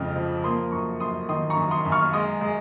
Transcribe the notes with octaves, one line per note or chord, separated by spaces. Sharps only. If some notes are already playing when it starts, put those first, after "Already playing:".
Already playing: F2 C#3 F3 G#3 F6
F3
A#3 C6 D#6
F#2 A#5 C#6
F#2 C6 D#6
D#3 C6 D#6
A#5 C#6
F#2
C6 D#6
F#2
C#6 F6
G#3 C6 D#6
G#3